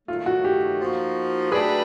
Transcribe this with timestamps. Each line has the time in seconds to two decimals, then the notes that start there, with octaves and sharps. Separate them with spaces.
0.08 D#3 F#3 A3 F4
0.26 F#4
0.44 G4
0.81 F3 A#3 D#4 F#4
1.51 F#3 A3 D4 G4 G#4 B4